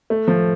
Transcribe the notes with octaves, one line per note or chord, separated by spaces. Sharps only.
A3
F3